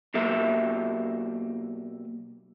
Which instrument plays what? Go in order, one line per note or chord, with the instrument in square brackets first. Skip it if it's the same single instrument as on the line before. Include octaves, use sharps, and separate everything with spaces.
[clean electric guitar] B2 F#3 A#3 G4 E5